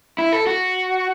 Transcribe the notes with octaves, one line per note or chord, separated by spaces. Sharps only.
E4
A4
F#4